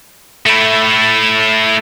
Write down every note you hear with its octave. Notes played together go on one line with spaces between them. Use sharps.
A3 E4